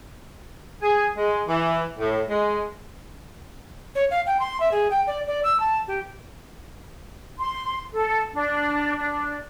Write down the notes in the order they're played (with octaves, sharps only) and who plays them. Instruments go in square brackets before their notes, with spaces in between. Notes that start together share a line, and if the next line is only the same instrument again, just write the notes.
[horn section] G#4
G#3
E3
A2
G#3
[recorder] C#5
F5
G5
C6
E5
G#4
G5
D5
D5
E6
A5
G4
[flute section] C6
A4
D4
D4